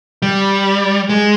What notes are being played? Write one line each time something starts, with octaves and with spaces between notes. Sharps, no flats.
G3
G#3